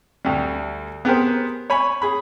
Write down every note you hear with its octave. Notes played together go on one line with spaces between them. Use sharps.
D2 G3
B3 G4 G#4 A#4 C5
C#5 G#5 B5
G#4 B5